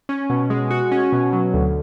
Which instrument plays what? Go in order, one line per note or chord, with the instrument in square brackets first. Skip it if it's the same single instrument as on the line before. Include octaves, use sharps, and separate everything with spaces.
[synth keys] C#4
B2
G#3
F#4
C#4
B2
F#3
D2